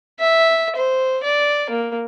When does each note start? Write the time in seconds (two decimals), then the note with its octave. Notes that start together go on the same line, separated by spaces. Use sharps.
0.19 E5
0.75 C5
1.23 D5
1.70 A#3